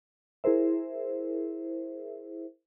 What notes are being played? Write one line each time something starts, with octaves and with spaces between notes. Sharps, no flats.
E4 G#4 A#4 C5 E5